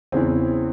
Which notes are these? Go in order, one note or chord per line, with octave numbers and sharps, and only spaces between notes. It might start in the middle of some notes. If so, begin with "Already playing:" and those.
E2 C#3 E3 C4